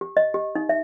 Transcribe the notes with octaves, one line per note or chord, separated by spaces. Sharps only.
G4
D#5
G4
D#4
E5